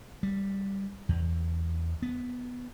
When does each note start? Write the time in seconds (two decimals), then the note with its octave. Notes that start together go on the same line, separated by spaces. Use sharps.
0.23 G3
1.09 E2
2.02 B3